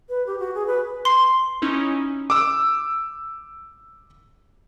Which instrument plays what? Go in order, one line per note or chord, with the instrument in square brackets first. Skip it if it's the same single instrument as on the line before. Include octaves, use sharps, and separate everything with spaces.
[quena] B4
G4
F#4
G#4
B4
[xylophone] C6 C7
[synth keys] C#4 D#4 E4
[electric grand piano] D6 E6